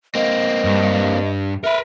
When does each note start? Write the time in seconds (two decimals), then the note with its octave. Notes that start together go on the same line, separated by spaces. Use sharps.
0.15 A#3 C4 D#5
0.65 G2
1.64 A#4 B4 E5